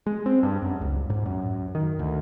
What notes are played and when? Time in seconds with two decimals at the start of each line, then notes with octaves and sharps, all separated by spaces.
0.06 G#3
0.26 C4
0.43 G2
0.62 F#2
0.81 C#2
1.10 G#2
1.26 F#2
1.75 D#3
1.99 D2